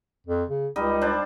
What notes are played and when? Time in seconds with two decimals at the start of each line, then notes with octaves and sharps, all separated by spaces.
0.26 F2
0.49 C#3
0.76 C#2 G3 D#4 D#5
1.01 D4 C5 A5